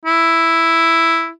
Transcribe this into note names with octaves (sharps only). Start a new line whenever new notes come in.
E4